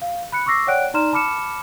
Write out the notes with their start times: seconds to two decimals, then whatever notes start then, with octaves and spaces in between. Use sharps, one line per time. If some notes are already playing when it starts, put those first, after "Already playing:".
0.02 F5
0.32 B5 F#6 C#7
0.46 C#6 D6 E6 A#6 C7
0.67 C#5 D5 F#5 G5 F#6 D7
0.94 D#4 D5 A#5 C6 F6 E7
1.13 A5 B5 D6 F6 C#7 E7